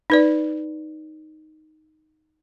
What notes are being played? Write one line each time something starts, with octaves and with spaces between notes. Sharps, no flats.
D#4 B4 D5